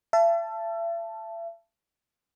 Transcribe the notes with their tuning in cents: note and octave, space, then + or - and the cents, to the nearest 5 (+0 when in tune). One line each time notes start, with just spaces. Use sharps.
E5 +40 A5 +0